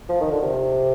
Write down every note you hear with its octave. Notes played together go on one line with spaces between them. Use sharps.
F3
D#3
D3
C3